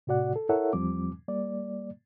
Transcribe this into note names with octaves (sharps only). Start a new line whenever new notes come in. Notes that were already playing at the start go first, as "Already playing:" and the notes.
A2 C3 F#4 D5 F#5
A4
E4 A4 A#4 C#5 E5 F#5
E2 F3 G3 C4 D6
G3 A#3 D5